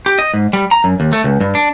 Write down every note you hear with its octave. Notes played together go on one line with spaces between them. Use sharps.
G4
D#5
G#2
G3
A#5
F#2
D#2
A3
C#2
G2
D4